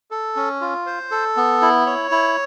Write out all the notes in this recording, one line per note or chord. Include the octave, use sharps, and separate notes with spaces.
A4
C#4
F4
C5
A4
B3
E4
C#5
E4